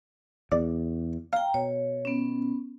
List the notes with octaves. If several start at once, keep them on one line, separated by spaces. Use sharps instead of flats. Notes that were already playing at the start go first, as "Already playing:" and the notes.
E2 D5
F5 G5 A#5
B2 C#5
B3 C#4